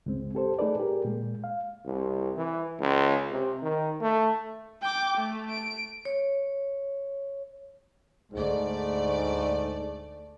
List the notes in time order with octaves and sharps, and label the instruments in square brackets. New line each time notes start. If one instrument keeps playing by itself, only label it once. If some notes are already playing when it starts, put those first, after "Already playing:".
[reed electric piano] C#2 G2 G#3 C4
G4 A4 C5
A3 D#4 G#4 A4 B4 D5
G4 G#4 A#4
A#2 G#3
F5
[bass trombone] C2
E3
C#2
C3
D#3
A3
[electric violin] G5 D6
A3
D7
[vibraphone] C#5
[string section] D2 A3 D5 [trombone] G#2